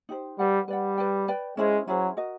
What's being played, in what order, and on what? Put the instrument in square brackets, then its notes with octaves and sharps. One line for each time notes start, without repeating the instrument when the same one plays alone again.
[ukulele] D#4 G4 C5
[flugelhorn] G3 [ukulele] B4 D5 F#5
[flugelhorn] G3 [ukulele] B4 D5 F#5
[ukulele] B4 D5 G5
B4 D5 G5
[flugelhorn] G#3 [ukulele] C#4 E4 G#4 C5
[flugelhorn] F#3 [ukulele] C#4 E4 G#4 C5
[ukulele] F#4 A#4 D#5